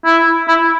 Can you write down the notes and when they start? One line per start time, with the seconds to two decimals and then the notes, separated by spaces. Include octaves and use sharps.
0.05 E4
0.48 E4